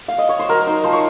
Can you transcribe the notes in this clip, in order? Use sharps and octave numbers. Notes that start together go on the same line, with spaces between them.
F5
D#5
C#5
C5
F#3 A#4
D#4 C5
F3 C5
C#5